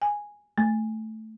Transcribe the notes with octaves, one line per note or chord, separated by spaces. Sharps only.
G#5
A3